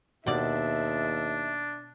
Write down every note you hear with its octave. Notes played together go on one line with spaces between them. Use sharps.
D#2 B2 D4 D5 E5